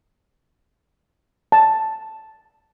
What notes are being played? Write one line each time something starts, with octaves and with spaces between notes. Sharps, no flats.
A5